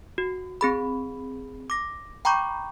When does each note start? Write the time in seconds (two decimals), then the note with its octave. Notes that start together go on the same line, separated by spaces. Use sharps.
0.18 F#4
0.61 C4 G#4 B5
1.70 D6 A#6
2.25 G5 A#5 B5 C#6 D6 G6